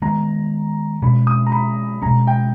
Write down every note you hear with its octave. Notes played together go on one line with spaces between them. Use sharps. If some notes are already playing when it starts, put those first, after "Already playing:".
D#3 G#3 B3 A#5
B2 G#3 C#4 B5
D#6
A#5
B5
B2 G#3 C#4 A#5
G5